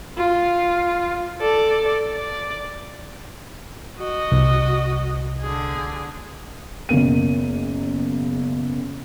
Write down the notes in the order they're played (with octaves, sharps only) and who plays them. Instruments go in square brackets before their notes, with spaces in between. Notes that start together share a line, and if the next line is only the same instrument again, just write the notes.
[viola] F4
A4 D5
D5
F#4 D#5
[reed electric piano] C2
[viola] D3 G#4
[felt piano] F#1 B2 A#3 D#7